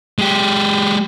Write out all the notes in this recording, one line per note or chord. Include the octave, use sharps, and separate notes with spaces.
G#3 G4